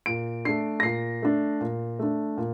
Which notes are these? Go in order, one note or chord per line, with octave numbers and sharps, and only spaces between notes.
A#2 D7
A3 D4 C7
A#6
A#2 C7
A3 D4
A#2
A3 D4
A#2